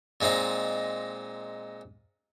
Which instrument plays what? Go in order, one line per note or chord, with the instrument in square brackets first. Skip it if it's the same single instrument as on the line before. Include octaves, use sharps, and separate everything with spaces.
[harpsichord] A#2 G#3 C4 D#4 D#5